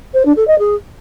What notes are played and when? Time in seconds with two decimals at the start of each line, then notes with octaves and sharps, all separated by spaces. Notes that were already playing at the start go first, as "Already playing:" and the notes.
0.14 C5
0.25 D4
0.36 A4
0.47 D#5
0.58 G#4